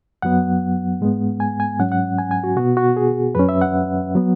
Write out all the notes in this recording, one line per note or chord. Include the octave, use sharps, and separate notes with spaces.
F#2 F#3 B3 F#5
G#2 G#3 B3
G#5
G#5
G#2 F#3 C#4 F#5
F#5
G#5
G#5
F#4
B2 B3 F#4
F#4
G#4
F#2 F#3 C#4 B4
E5
F#5
F#3 B3